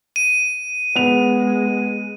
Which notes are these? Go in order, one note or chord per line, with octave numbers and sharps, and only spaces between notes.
D#7
G#3 B3 F7